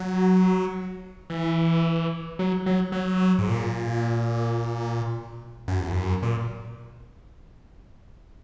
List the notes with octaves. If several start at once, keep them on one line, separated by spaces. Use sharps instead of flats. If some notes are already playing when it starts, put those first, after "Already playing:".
Already playing: F#3
E3
F#3
F#3
F#3
G#2
A#2
F#2
E2
F#2
A#2